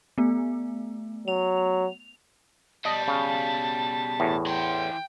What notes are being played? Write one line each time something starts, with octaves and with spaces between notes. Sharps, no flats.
A3 B3
F#3 F7
B2 G3 D#5 A5
C#3
E2 A2
E3 G5 C6